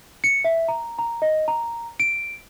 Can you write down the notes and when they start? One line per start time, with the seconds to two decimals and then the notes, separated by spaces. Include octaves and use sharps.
0.24 C#7
0.44 E5
0.68 A#5
0.99 A#5
1.22 D#5
1.48 A#5
2.00 D7